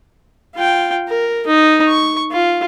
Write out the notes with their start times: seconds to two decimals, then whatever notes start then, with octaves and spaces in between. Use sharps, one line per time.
0.56 F4 G5
1.09 A#4
1.47 D#4
1.88 C#6
2.32 F4